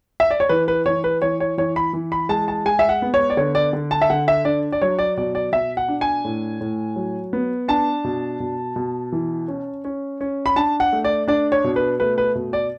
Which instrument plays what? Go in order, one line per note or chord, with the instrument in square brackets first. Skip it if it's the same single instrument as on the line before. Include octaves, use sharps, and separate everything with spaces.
[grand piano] E5
D5
C#5
E3 B4
B4
E3 C#5
B4
E3 C#5
C#5
E3 C#5
B5
E3
B5
G#3 A5
A5
G#3 G#5
E5
F#5
B3
C#5
D5
D3 C#5
D5
D3
A5
E5
D3 F#5
E5
D4 D5
D5
F#3 C#5
D5
B2 D5
D5
B2 E5
F#5
D4
G#5
A2
A2
F#3
B3
D4 A5
B2
B2
B2
E3
C#4
C#4
C#4
B5
D4 A5
F#5
A3
D5
D4 D5
C#5
B2
B4
A3 B4
B4
B2
D5